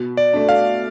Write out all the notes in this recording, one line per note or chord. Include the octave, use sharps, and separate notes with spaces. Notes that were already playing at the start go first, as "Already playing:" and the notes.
Already playing: B2
D5
A3 D4
F5